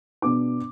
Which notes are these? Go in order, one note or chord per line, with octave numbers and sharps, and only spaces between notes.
B2 B3 D4 D6